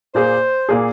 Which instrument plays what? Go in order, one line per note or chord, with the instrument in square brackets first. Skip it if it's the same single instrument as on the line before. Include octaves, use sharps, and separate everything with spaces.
[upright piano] A#2 A#3 G#4 [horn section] C5
[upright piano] A#2 A#3 G#4